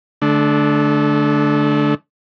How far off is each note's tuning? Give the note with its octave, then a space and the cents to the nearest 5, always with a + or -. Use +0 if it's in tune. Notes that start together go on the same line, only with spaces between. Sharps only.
D3 +0 A3 -30 D4 +0